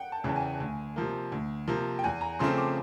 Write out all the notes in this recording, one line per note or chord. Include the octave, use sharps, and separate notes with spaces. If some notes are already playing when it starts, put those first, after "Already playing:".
Already playing: F#5 G5
A5
E2 C#3 E3 A5
G#5
D2
C3 F3 A#3
D2
C3 F3 A#3
G5
E2 G#5
A#5
C#3 F3 A3 C4 C6
D6